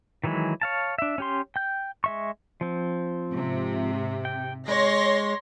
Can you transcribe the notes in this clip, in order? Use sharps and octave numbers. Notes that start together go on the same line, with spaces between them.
D#3 E3 F#3 G#3 E4
C#5 F5 A5
D4 E5
C#4 G4 C6
G5 G6
G#3 E5 C#6
F3 C4
G#2 C3
G5
G#3 C#5 C6 A#6